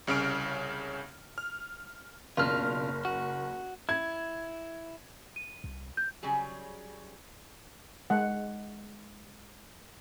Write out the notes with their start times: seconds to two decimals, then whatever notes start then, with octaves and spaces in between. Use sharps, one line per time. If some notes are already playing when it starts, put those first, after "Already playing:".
0.07 C2 C#3 C#4 F6 D7
1.38 F6
2.37 F#1 B2 D4 F4 F6
3.05 F#4
3.89 E4 G#6
5.36 D#7
5.64 C2
5.97 G6
6.23 C#3 F#3 G3 G#4
8.10 G#3 F#5